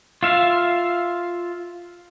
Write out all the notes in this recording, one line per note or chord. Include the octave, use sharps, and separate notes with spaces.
F4 E5 F5